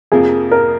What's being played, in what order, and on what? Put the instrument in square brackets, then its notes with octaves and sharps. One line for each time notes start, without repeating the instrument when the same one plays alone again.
[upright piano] F2 C3 F3 A#3 [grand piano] G#4
[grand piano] A#4